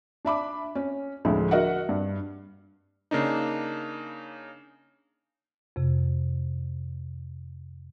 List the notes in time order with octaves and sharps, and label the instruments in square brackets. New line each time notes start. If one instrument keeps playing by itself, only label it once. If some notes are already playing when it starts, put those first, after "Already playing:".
[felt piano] D4 E5 B5 D6
C#4
D2 A2 D3 F3 G#3
F#4 A#4 D#5 E5 F#5
G2
[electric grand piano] C#3 A#3 D4 D#4
[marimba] F2 C3